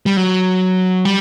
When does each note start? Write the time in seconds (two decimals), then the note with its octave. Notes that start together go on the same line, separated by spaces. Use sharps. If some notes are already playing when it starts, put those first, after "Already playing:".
0.06 G3
0.17 F#3
1.05 G3